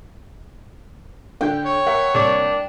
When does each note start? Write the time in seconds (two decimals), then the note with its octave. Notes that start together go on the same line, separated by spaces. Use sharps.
1.41 D3 D4 G5 G6
1.65 C#5
1.86 A#4 E5 F#5
2.14 C2 A#3 D4